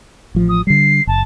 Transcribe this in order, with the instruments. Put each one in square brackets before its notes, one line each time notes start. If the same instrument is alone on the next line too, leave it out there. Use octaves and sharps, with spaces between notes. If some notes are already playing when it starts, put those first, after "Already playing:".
[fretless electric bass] A1 F3
[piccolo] D#6
[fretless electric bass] D3 G3 [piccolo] C7
[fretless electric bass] F#1 [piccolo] A5